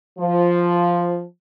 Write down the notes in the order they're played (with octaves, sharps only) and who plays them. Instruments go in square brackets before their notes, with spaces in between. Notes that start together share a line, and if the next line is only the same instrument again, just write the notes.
[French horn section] F3